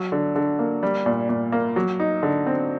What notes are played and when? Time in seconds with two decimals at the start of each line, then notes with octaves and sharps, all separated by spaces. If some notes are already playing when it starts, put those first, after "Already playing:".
Already playing: F#3
0.12 D3
0.36 D3
0.59 A#3
0.83 G3
1.06 A#2
1.29 A#2
1.52 A#3
1.76 F#3
2.00 D#4
2.23 D3
2.47 C4